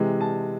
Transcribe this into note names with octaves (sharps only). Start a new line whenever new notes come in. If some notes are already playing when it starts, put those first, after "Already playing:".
Already playing: C3 E3 G#3
A5